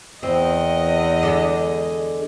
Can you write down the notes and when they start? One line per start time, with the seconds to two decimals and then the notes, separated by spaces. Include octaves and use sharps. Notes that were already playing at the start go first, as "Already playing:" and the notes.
0.23 E2 C4 D#5
1.23 D3 G#3 B3